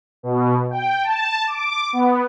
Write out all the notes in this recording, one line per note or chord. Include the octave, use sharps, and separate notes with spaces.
B2
G5
A5
D6
B3